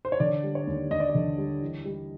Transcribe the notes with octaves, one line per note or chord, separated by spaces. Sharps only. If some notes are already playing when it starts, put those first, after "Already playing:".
C5
C#5
D3 D5
G3
C#5
D#2
D#2 D#5
D5
D#5
D3
G3
E3
G3